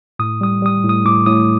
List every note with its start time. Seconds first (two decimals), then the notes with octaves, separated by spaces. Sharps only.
0.19 A2 D#6
0.41 G3 D#6
0.62 G3 D#6
0.84 A2 D#6
1.05 A2 D6
1.26 A2 D#6